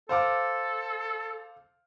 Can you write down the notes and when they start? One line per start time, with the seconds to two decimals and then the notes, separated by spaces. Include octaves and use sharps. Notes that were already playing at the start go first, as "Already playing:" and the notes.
0.09 A4 C5 F5 D6